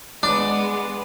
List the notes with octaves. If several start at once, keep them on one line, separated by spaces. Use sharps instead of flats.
G#3 B3 D4